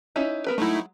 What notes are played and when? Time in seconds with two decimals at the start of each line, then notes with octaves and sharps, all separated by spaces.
0.16 C#4 D#4 E4
0.47 B3 A#4 B4
0.58 F#3 G#3 A3 D#4 E4